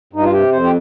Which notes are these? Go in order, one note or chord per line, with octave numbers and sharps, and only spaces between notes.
G2 D#4
F4
C3 G4
F2 C5
G4